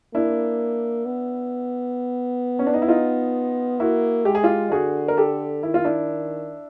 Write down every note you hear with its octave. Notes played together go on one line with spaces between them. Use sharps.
A#3 D4 E4
B3
C#4
D4
D#4
E4
D#4 F4
A#3 E4 F#4
G#3 G4
G#4
F4 G4
D3 F#4 G#4
A#4
G4 A4
D#3 E4
F4
D4 E4